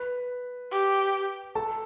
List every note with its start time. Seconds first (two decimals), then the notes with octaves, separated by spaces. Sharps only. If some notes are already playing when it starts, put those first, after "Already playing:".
Already playing: B4
0.72 G4
1.55 A4 A5